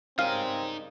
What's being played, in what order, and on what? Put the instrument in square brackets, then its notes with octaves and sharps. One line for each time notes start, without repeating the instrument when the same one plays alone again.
[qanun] C#3 G3 A#4 [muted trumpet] C4 [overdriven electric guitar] D#4 G#5 [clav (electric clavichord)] F5